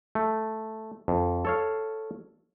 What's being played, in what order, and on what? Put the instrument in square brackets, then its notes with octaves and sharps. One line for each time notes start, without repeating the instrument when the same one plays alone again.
[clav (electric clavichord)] A3
F2
A4 C#5 F5